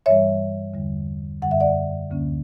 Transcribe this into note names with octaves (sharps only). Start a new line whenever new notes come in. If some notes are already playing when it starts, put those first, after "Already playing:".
G2 E3 G3 C#5 E5
E2 D3 G3
F#2 D3 G3 F#5
E5
D5 F#5
D2 D3 A#3 C#4